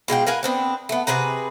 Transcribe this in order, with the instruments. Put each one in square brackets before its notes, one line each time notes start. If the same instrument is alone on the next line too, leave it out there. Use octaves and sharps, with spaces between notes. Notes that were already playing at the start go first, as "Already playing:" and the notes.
[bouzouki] B2 G#3 F4 G5
A#4 B4 F5 G#5
B3 C4 D4
A3 B3
C3 G#4 B4 A#5